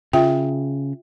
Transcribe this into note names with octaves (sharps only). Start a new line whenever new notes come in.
C#3 F4 E5 G5